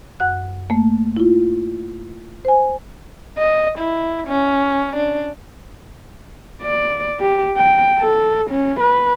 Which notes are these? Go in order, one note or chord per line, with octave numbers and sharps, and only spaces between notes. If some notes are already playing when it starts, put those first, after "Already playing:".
F#2 F#5 F#6
A3 A#3
E4 F4
C5 G#5
D#5
E4
C#4
D4
D5
G4
G5
A4
C#4
B4